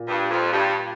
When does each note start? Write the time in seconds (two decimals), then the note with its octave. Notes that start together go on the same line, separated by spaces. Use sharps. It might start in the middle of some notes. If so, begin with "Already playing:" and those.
Already playing: A#2
0.08 G2
0.30 F2
0.52 G2